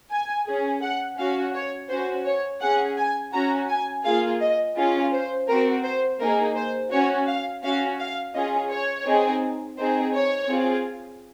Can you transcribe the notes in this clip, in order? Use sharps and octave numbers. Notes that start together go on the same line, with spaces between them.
G#5
C#4 G#4
F#5
C#4 F#4 F5
C#5
C#4 F#4 C5
C#5
C#4 G#4 F#5
G#5
C#4 F#4 A#5
G#5
A#3 F4 G#4 F5
D#5
C#4 F4 G#4
C5
C4 F#4 A#4
C5
A#3 D#4 G#4 A#4
C5
C#4 F#4 C#5
F5
C#4 F#4 F5
F5
C#4 F4 G#4 D#5
C#5
C4 D#4 G#4
C4 D#4 G#4 C5
C#5
C4 F4 G#4